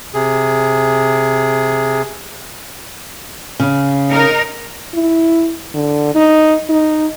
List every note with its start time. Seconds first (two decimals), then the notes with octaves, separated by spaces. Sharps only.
0.14 C3 G#4
3.60 C#3
4.10 D#4 A#4
4.94 E4
5.74 D3
6.15 D#4
6.69 D#4